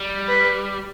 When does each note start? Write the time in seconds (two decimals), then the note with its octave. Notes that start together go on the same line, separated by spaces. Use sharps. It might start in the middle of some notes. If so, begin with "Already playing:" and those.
Already playing: G3
0.28 B4